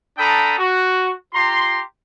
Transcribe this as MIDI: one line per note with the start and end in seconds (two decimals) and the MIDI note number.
0.18 0.57 62
0.18 0.57 69
0.18 0.57 79
0.18 0.57 82
0.18 0.57 83
0.18 0.57 87
0.58 1.12 66
1.33 1.80 65
1.33 1.80 67
1.33 1.80 82
1.33 1.80 84